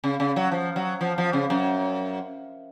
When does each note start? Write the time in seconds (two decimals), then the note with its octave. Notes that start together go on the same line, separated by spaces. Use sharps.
0.04 C#3
0.20 C#3
0.36 F#3
0.52 F3
0.76 F#3
1.01 F3
1.18 F3
1.33 C#3
1.50 F#2